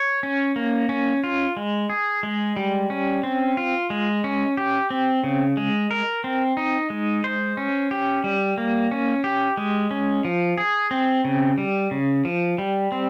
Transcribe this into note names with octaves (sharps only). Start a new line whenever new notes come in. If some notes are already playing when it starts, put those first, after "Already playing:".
Already playing: C#5
C#4
A#3
C#4
F4
G#3
G#4
G#3
G3
C#4
C4
F4
G#3
C#4
G4
C4
C#3
G#3
A#4
C4
D#4
G#3
C5
C#4
G4
G3
A#3
C#4
G4
G#3
C#4
F3
G#4
C4
C#3
G3
C#3
F3
G3
C4